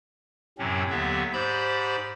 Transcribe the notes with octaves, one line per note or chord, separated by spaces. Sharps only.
F#2 A2 C3 F#3 C4 C#4
D#2 D3 F#3 B3 G4 E5
G#2 G4 C5 D5 B5 G6